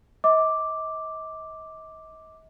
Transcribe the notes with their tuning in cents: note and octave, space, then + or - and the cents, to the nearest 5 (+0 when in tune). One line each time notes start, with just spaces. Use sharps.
D#5 +40 D6 +0